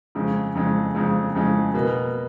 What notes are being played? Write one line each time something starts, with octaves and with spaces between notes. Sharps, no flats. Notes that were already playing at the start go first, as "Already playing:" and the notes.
F2 C#3 G#3
F2 C#3 G#3
F2 C#3 G#3
F2 C#3 G#3
B2 A#3